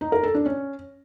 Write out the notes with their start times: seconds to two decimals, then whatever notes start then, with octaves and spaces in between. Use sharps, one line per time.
0.01 D#4
0.12 A#4
0.23 A4
0.35 D4
0.46 C#4